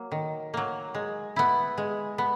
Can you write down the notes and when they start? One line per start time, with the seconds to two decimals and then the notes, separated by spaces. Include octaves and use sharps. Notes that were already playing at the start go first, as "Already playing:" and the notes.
Already playing: F#3 A#3
0.12 D#3
0.54 F#3 A#3
0.95 G#3
1.36 B3 E4
1.78 G#3
2.18 B3